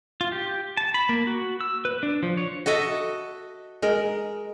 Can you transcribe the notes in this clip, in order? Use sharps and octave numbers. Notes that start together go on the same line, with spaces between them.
F4
G4
A5
B5
A#3
F#4
E6
B4
D4
F3
C#5
F#4 A4 D#5 E5
G#3 A#4